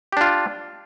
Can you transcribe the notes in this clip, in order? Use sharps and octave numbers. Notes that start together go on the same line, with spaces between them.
D4 F4 G4